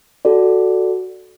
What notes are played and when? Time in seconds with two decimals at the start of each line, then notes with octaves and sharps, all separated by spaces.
0.25 F#4 A4 D5